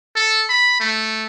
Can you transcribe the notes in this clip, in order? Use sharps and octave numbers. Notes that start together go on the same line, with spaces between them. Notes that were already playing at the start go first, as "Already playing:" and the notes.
A4
B5
A3